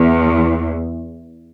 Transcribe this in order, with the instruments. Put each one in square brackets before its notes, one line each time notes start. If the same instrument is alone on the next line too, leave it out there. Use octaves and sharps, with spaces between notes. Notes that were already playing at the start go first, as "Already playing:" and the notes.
Already playing: [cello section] E2